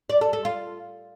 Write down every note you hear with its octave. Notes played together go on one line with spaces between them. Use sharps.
D5
A4
A4
F4